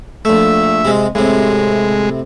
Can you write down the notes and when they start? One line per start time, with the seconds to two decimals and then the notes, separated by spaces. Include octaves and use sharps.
0.25 A#1 A3 E5
0.85 C3 G#3
1.15 A2 C3 G#3